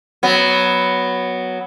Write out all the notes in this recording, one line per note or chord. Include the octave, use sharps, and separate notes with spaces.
F#3 B3